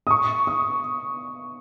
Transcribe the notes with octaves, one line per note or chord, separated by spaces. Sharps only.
D#6
C#6
D#6